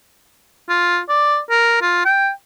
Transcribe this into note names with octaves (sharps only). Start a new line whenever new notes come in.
F4
D5
A#4
F4
G5